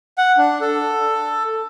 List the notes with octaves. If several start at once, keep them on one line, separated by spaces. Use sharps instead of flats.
F#5
D4
A4